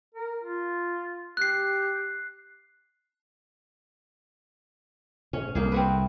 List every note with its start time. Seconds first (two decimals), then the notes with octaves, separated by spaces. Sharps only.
0.14 A#4
0.42 F4
1.37 G4 F#6 C7
5.33 G#2 C#4
5.55 C2 A2 A#3 D#4 G#4
5.72 C4 F#4 B4